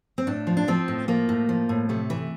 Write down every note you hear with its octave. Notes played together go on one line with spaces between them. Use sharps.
C4
A2 D4
F3
D4
F3 C4
A2
F3 A#3
A2
F3
A2
C3 A3
E3